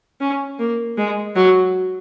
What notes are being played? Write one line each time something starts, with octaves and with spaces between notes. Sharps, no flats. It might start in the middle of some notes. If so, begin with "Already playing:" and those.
C#4
A#3
G#3
F#3